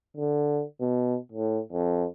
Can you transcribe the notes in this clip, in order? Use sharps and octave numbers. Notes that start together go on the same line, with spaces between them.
D3
B2
A2
F2